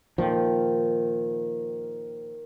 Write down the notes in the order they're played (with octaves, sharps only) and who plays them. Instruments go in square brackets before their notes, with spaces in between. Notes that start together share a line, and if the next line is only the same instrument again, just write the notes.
[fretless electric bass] A#2 F3 [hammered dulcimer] D#3